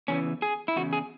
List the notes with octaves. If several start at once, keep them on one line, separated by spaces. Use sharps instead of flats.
E2 C#3 E3 C#4
G#4
E4
E2 C#3 F#4
G#4